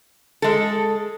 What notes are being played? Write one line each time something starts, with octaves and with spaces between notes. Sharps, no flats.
G#3 A4